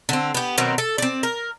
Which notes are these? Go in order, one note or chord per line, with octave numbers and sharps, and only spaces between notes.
D3 C4
B3 G4
B2 D#3 F#3 C4
A4
C4 D5
A#4